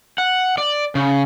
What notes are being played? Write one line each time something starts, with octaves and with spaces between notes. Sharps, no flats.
F#5
D5
C#3